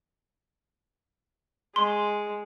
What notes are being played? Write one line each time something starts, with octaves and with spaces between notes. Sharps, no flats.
G#3 C6